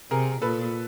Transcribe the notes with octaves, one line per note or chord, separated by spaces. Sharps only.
C3 G#4 A#4
A#2 A4 B4